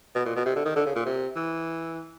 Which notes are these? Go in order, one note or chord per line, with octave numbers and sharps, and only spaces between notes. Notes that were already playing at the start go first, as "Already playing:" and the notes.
B2
A#2
B2
C3
D3
D#3
D3
C#3
A#2
C3
E3